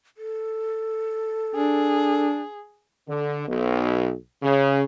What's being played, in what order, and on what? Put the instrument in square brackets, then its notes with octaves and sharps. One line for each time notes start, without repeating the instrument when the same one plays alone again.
[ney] A4
[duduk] D4 [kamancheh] G#4
[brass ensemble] D3
B1
C#3